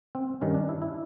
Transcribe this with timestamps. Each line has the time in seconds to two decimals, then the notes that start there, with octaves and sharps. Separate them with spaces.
0.15 C4
0.41 G2 D#3 G3 C#4
0.54 D4
0.69 E4
0.82 E4